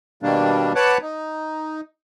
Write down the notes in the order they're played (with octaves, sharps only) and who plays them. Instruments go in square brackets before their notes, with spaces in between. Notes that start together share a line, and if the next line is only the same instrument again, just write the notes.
[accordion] B2 D#3 G3 A#3 D4
B4 C#5 F#5 A5 D6 F#6
D#4